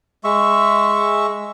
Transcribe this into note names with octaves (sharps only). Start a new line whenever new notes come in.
G#3 E5 C#6